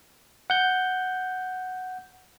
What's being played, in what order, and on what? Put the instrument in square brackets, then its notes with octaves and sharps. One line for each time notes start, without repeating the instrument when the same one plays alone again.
[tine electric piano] F#5 G6